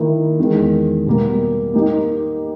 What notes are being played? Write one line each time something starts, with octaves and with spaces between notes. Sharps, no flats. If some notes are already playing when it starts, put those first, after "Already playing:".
Already playing: D#3 A#3 E4
E2 D#3 G#3
B2 G3 A#3
A#3 D#4 G4